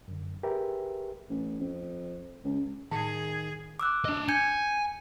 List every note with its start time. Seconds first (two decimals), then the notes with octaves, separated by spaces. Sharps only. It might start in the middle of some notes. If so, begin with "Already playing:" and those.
0.08 F#2 D3
0.43 G4 G#4 A#4 B4 E5
1.30 A1
1.61 F2
2.44 C#2
2.92 A2 D#3 G#4
3.80 D6 E6 F#6
4.05 D4 D#5
4.29 G#5 G6 G#6 C#7